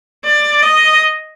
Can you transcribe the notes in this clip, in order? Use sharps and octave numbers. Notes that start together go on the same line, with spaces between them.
D5
D#5